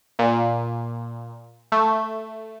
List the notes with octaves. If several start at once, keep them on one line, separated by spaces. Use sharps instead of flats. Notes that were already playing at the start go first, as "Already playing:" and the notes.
A#2
A3